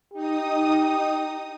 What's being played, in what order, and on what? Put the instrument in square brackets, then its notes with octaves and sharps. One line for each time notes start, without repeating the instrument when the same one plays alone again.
[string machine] D#4 D#6 [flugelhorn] G4